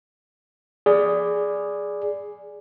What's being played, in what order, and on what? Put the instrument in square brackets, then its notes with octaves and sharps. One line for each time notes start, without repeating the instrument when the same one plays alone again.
[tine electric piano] G#4 D5